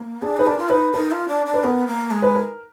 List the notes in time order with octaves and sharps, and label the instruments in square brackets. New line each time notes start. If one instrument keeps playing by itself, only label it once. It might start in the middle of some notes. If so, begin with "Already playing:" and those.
Already playing: [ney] A#3
[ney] D4 [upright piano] G#4
[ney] D#4 [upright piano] B4
[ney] D4 [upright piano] A#4
[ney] F4
[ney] D#4 [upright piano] B4
[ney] D#4 [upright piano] A#4
[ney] F4
D4
D4
[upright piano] B4
[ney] B3 [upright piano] A#4
[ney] A#3
G#3
[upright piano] B4
A#4